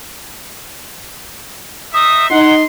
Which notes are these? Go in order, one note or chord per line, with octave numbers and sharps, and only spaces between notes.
D#4 E5 D#6
D#4 F#5 C6